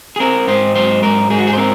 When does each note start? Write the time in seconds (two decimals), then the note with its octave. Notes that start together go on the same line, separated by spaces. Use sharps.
0.16 G#4
0.20 C4 A#4
0.47 G#2 C5
0.76 F#3 C5
1.03 G#2 A#4
1.30 G#2 G#4
1.38 F#4
1.47 G#4
1.53 C5
1.57 C4 A#4